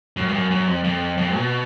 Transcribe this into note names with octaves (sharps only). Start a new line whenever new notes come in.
F#2
G2
F#2
F#2
F2
F2
F2
B2